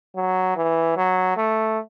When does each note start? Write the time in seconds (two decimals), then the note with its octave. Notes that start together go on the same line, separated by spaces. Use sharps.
0.16 F#3
0.56 E3
0.97 F#3
1.37 A3